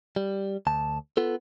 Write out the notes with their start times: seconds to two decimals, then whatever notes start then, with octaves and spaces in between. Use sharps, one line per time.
0.16 G3
0.67 D2 A5
1.17 B3 F4 A4